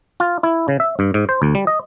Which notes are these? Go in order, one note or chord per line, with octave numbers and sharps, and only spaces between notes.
F4
E4
C#3
E5
G2
G#2
C5
D2
G3
D#5